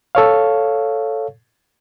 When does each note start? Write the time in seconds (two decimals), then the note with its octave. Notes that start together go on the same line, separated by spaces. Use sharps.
0.15 A4 C#5 F5